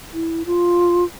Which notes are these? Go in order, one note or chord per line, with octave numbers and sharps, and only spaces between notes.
E4
F4